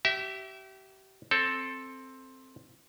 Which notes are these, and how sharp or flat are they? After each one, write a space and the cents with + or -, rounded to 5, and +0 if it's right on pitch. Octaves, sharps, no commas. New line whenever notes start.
G4 -35 E5 +0
C4 +10 A4 +0